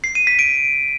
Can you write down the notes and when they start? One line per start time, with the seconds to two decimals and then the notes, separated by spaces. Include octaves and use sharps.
0.04 C7
0.15 D#7
0.27 B6
0.39 D7